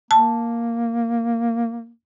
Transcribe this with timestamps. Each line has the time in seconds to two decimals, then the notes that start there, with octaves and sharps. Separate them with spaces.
0.11 A#3 A5